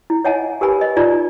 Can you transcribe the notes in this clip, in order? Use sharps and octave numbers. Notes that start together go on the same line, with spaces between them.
E4
C#5 D#5 E5 F#5 G#5 A5
G4 A#4 B4 G#5 B5
D#5
D#4 F4 D5 A#5